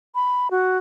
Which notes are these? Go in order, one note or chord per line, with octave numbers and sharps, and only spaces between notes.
B5
F#4